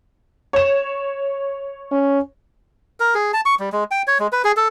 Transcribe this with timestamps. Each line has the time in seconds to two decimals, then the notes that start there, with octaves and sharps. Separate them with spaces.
0.53 C#5 E7
1.91 C#4
3.00 A#4
3.14 G#4
3.33 A5
3.46 C#6
3.59 G3
3.72 G#3
3.91 G5
4.07 C#5
4.19 G#3
4.32 B4
4.44 G#4
4.57 A4